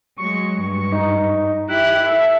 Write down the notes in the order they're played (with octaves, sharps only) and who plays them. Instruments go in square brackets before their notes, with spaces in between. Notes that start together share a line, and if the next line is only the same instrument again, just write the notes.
[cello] F#3 G#3 [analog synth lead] C#6
[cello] G2
[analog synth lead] D#4
[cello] E4 G4 [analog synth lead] F#6
[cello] A4 [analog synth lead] E5